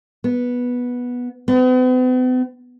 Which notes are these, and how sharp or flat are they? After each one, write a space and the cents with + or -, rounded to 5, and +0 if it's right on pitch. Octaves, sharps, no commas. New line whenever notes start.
B3 -10
B3 +45